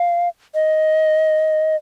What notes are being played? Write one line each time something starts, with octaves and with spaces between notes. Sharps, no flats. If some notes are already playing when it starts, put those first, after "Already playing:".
Already playing: F5
D#5